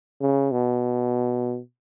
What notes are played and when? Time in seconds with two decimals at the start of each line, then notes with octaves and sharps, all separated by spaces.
0.21 C#3
0.51 B2